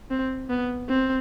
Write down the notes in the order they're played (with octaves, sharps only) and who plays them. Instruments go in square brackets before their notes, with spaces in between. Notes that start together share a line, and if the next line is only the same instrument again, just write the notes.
[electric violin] C4
B3
C4